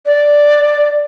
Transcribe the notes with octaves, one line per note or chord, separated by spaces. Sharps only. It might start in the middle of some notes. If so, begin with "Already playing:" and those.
D5